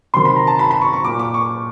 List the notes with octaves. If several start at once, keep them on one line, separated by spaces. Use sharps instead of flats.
C3 D#3 C6
B5
A#5
A5
B5
B5
C#6
C#6
A#2 D6
D6
C#6